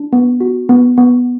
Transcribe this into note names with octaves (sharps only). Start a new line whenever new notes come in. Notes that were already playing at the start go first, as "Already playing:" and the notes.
Already playing: D4
B3
F#4
B3
B3